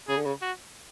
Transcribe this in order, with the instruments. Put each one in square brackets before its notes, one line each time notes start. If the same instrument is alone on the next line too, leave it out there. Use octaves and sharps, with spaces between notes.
[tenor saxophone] C#3 [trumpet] G#4
[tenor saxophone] D3
C#3
[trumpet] F#4